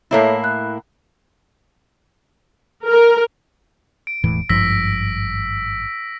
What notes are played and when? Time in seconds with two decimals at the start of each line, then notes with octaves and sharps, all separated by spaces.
0.11 A2 A#3 E4 A4 C#5 E5
0.44 F#6
2.87 A#4
4.07 D7
4.24 E1 A2 E3
4.49 G#1 G2 F3 E6 A#6 B6